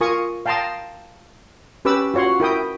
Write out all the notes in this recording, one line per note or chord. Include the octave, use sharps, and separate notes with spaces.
F4 A#4 G#5 C#6 D#6
F5 G5 A5 A#5 C6 D#6
C#4 G4 B4 B5 D6 E6
F4 F#4 C#5 F#5 C6
E4 A#4 G5 D#6